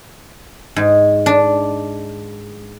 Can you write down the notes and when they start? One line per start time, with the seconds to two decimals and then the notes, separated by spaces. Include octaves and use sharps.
0.76 G#2
1.26 D4